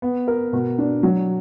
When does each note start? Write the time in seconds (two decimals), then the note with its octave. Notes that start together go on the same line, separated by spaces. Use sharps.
0.02 B3
0.28 A#4
0.53 B2
0.78 D4
1.03 F#3